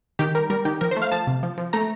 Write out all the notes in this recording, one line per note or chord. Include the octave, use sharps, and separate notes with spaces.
D#3 G4
G3 A#4
G3 A#4
D#3 G4
F3 A#4
C5
A3
F5
F3 A5
C3
F3
F3
A3 A#5